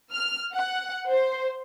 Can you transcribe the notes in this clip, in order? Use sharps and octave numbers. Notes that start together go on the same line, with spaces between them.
F6
F#5
C5